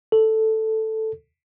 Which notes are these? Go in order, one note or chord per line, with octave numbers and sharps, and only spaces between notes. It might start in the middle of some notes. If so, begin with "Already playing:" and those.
A4